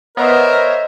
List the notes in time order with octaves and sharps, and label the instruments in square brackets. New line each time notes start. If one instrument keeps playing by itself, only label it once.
[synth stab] B3 [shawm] A#4 [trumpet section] C5 C#5 E5 [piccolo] D#5